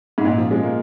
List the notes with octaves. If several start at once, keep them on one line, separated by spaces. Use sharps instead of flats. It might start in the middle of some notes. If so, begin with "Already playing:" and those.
G#2
A#2
F3
G#3
A#3